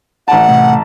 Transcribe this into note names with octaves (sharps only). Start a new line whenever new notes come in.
A1 F#5 A5
A2 C3 A3